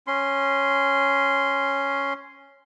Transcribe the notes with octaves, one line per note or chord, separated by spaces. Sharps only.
C#4 C6